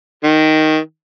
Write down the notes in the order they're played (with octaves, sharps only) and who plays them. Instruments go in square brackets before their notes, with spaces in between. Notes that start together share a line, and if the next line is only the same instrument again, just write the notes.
[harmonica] D#3